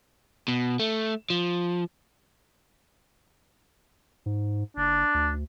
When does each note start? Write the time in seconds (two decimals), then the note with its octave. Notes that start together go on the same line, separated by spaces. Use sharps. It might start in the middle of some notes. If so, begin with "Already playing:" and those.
0.48 B2
0.80 A3
1.30 F3
4.26 G#2
4.77 F#1 D4
5.14 D2